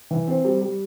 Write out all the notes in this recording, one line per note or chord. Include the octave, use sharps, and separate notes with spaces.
E3
C4
G3
G3